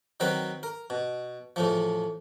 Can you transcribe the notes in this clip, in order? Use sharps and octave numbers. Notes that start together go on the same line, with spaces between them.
D#3 F#3 C4 B4
A#4
B2
E2 A2 F3